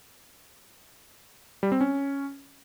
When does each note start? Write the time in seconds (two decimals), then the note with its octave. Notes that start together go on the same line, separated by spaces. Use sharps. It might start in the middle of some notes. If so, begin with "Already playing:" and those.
1.63 G3
1.72 C4
1.81 C#4